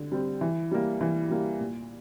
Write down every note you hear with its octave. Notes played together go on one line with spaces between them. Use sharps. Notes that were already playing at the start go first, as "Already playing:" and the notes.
Already playing: D3 G3
G3 C4
E3
G3 A#3
E3
G3 A#3
A#2